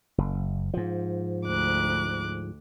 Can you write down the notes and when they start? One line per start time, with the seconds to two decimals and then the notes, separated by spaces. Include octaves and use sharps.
0.18 F#1
0.74 G#2 F3
1.46 D2 D6 F#6